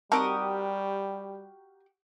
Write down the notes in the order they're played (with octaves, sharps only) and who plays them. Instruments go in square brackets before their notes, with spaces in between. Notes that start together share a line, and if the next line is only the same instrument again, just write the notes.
[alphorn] G3 [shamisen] C4 D#4 A5 [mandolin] F#4 G4 D#6 [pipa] A#4